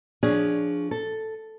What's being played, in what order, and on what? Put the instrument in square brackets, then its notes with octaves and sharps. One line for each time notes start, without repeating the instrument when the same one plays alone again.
[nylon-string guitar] F3 C#4 D4 G#4
A4